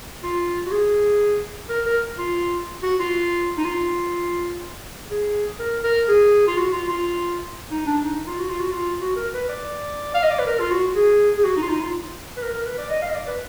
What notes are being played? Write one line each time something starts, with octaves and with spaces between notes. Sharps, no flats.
F4
F#4
G#4
A#4
A#4
F4
F#4
F4
D#4
F4
G#4
A#4
A#4
G#4
F4
F#4
F4
F4
D#4
D4
D#4
F4
F#4
F4
F#4
F4
F#4
A#4
B4
D5
F5
D#5
D5
B4
A#4
F4
F#4
G#4
G#4
F#4
D#4
F4
D#4
F4
B4
A#4
A#4
B4
D5
D#5
F5
D#5
D5
B4